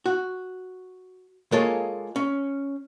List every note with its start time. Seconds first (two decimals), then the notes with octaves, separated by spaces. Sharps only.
0.06 F#4
1.52 G#3 A#3 F4 G#4 A4 C#5
2.16 C#4